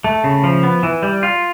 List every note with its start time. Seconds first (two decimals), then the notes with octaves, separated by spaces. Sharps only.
0.04 A3
0.24 C#3
0.44 F3
0.63 B3
0.83 E3
1.03 G3
1.23 F4